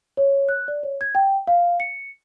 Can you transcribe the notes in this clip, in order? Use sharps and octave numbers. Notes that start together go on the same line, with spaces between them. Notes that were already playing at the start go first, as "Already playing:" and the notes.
C#5
F#6
D5
C#5
G#6
G5
F5
C#7